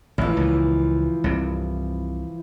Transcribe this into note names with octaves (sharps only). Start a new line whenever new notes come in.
A1 E3 F3
C#2 A#2
C2 G2 C3